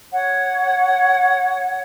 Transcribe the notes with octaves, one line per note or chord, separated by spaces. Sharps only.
C#5 F#5